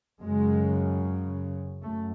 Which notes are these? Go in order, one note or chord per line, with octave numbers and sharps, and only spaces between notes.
F#2 C#3 G#3
F#2 A3